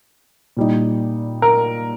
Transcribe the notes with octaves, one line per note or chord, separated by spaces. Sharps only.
A#2 G3 D#4
A#4